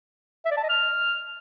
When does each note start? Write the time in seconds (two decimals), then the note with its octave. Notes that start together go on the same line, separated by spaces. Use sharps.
0.45 E5
0.51 D5
0.57 A5
0.63 D#5
0.69 F6